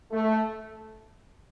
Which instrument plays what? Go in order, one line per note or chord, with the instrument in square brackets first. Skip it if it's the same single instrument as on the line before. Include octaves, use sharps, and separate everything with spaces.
[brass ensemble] A3